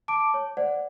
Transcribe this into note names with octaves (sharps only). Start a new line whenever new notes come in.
A5 D6 D7
C#5
C5 D5 F#5